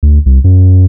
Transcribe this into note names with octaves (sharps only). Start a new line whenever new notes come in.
D2
C2
F#2